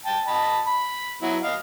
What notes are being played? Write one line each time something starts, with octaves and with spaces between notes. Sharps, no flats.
G5 A5
D#5 A5 B5
B5
F#3 B3 E4
D#5 F5